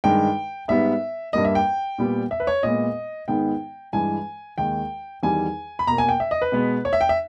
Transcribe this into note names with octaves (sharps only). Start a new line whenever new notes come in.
G2 D#3 G#3 G5
G#2 G3 B3 E5
G2 G3 A#3 D#5
E5
G5
A#2 G3 B3
E5
B4
C#5
A#2 G#3 B3 D#5
G#2 D#3 G#3 B3 G5
G2 E3 G#3 G#5
D#2 D#3 G#3 G5
E2 D#3 G3 G#5
B5
B2 A#3 A#5
G#5
G5
E5
D#5
B4
B2 G#3 B3
C#5
E5
G5
E5